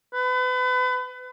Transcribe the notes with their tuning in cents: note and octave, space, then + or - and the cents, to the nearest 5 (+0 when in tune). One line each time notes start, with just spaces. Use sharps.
B4 +35